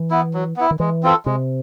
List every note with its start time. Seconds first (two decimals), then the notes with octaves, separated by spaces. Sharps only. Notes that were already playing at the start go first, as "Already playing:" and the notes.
Already playing: E3
0.11 B3 E4
0.34 F#3
0.57 B3 E4
0.71 D#3
0.80 E3 G#3
1.03 C4 F4 A4
1.26 C3 G#3